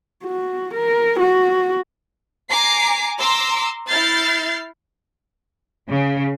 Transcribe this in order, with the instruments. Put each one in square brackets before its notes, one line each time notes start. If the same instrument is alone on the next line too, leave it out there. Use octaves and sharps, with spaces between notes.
[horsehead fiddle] F#4
A#4
F#4
[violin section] G#5 A#5 D6 C7
A#5 C6 D6 E6
E4 F6 G6 A6 C7
[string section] C#3